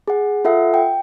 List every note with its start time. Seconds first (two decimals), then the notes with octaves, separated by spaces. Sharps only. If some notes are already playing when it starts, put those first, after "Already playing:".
0.08 G#4 F#5
0.45 F4 A4 E5 F#5
0.74 G5